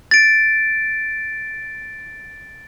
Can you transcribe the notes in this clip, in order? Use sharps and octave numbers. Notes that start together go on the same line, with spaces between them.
A6 D7